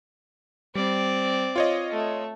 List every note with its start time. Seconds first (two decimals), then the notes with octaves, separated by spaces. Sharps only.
0.75 G3 C4 D5
1.56 F4 C#5 D#5
1.91 A3